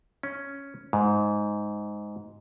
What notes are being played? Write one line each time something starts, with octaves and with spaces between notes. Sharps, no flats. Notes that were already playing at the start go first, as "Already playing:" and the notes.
C#4
G#2